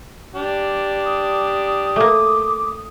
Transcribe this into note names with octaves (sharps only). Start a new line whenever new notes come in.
D4 G4
D#6
A3 A#3 D6